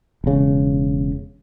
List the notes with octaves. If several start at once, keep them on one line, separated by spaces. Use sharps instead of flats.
E1 C#3